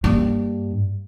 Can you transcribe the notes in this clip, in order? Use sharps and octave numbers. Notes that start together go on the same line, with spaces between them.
G2 A#3